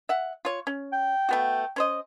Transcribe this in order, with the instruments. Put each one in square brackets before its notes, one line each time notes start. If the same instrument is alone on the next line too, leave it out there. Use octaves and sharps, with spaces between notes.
[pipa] E5 F#5
F4 C#5
C#4
[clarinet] G5
[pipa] A3 B3 F#4
C#4 C5 D#5